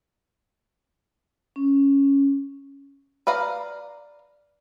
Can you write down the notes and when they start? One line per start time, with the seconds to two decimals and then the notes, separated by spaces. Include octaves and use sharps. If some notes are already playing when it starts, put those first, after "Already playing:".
1.56 C#4
3.27 B4 D5 F5 A#5